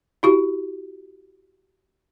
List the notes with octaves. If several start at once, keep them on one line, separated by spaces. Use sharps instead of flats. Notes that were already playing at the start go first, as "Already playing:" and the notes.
E4 F#4 G4